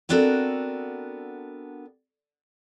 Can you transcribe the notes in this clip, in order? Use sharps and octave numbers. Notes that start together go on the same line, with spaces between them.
B3 C4 D4 F#4 A4 A#4